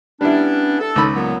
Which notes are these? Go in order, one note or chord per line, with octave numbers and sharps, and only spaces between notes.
G3 B3 C#4 D4 E4
A4
C#2 D#4 B5
A#2 F#3 B3